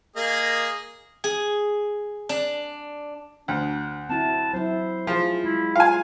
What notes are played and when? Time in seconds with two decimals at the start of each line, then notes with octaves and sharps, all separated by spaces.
0.16 A#3 G#4 D#5
1.24 G#4
2.29 D4
3.48 D2 D4
4.09 C4 E4 F#4 A5
4.53 F#3 C4 E4 C5
5.07 F3 F4 G#4
5.44 G#3 E4
5.76 F4 F5 G#5